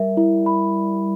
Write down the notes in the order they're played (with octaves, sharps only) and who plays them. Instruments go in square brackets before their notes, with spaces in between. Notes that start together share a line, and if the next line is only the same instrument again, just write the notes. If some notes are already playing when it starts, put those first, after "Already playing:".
Already playing: [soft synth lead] G3 [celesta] A#4 E5
[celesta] E4
B5